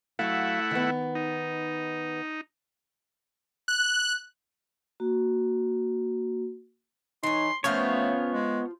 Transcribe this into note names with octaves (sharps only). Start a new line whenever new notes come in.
F#3 A3 E4 F5 F#5
D#3 B3
D#4
F#6
A#3 F#4
E3 D#4 C#5 C6
F3 A3 B3 C#4 F4 C5 C#5
G#3